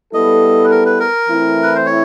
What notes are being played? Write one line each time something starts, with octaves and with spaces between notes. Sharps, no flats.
G3 B3 E4 A4 D#5
B4
A#4
B4
A#4
E3 A3 C4 E4
B4
C5
C#5